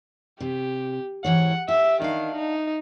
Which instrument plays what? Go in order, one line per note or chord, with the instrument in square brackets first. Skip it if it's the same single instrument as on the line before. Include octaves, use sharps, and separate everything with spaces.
[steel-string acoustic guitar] C3 [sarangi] G4
[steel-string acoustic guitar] G#2 E3 C#5 [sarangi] F#5
[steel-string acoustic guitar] G4 [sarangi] E5
[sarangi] D#3 [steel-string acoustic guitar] D4 F5
[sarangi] D#4